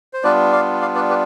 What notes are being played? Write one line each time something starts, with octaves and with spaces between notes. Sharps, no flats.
C5
G3 B3 D4 F4 B4 D5
D5 F5
D5 F5
B4 D5
G4 B4